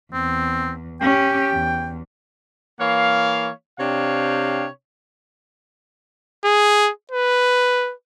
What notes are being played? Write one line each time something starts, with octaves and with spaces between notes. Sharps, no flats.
E2 C4
C#4 G4 G5
E2
E3 A#3 C#5 F5
C3 D4 C#5 F5 G5
G#4
B4